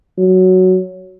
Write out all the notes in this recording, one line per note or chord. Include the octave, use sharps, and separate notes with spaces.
F#3